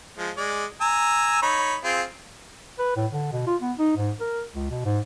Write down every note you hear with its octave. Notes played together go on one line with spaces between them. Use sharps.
F3 G#3
G#3 D5
G#5 A#5 E6
D#4 C#5 B5
C4 F4 G#4
B4
A2
D3
B2
F4
B3
D#4
G#2
A#4
C#2
B2
G#2